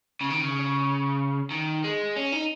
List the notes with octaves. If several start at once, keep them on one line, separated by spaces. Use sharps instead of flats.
C#3
D#3
C#3
D#3
G#3
C#4
D#4